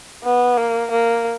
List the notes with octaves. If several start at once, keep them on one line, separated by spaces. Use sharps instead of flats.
B3
A#3
A#3